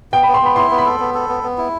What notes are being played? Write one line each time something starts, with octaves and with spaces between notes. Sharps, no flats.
B3 G5
B3 B5
C6
B3 B5
E4 C6
B3
B5
A4
B3
A4
B3
B3
E4